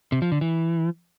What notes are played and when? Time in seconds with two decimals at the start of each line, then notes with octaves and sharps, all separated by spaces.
0.12 C3
0.22 F3
0.32 D3
0.41 E3